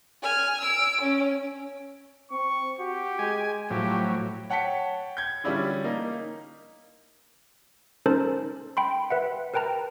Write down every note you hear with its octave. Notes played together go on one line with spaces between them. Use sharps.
G#5 F6
E6 D7
C#4
C4 C#6
F#4 G4
G#3 G#5
A2 F3 F#3 G4
C#5 F#5 G5 A5 B6 C#7
G6 G#6
D3 G3 C#4 D4 E4 F4
A#3 D#4
C#4 D#4 A4 A#4 C5 A5
G5 B5 C6
B4 E5 F#5
A#4 B4 G5 A5 A#5